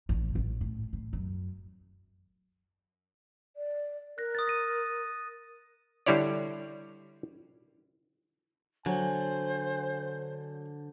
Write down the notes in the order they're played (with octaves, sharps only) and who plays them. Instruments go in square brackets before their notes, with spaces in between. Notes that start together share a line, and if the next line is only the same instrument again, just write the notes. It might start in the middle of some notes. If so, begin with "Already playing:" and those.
[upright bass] A1 A2
A1
A2
A2
F#2
[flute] D5
[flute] A#4 [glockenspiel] F#6 A#6
[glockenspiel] D#6 A6
A#6 D#7
[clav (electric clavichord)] D3 G3 E4 C#5 D5
[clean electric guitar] D3 [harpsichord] F#3 [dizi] C5 [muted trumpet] G#5